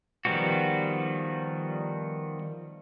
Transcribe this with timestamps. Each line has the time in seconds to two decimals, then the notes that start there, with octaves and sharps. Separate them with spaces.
0.25 D#3 F3 G3 B3 F#4